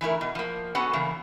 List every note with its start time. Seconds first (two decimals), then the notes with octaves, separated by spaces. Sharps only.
0.01 E3 A3 E4 A#4
0.21 B2
0.35 F3 A#3
0.75 B3 C#4 F#4 A4 B4 F#5
0.93 C#3 E3 A#3